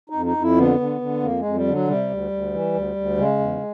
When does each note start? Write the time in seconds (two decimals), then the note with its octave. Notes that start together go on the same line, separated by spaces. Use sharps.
0.10 D#4
0.15 F2
0.26 D#4
0.37 F2
0.42 E4
0.58 D3 B3
0.80 D3
1.01 D3
1.23 F2 A#3
1.39 G#3
1.45 F2
1.56 G3
1.67 D3 F#3
1.88 C3 G3
2.10 D2
2.31 D2
2.53 E3
2.74 D2
2.96 D2
3.17 C#3 G#3
3.39 E2